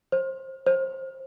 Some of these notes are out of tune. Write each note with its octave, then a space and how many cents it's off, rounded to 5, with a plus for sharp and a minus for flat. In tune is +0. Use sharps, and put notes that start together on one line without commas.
C5 +25
C5 +25